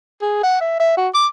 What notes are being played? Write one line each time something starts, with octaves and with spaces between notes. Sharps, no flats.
G#4
F#5
E5
E5
F#4
D6